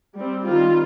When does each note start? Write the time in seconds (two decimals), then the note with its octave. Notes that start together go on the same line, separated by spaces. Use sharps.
0.16 G3 C4
0.45 D#3 G3 C4 F4